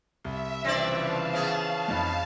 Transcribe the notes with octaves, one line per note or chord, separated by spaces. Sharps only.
C2 E5
C#3 E3 F3 C4 D4 D5
F5 A5
B3 C#4 G#4
F2 D#4 B5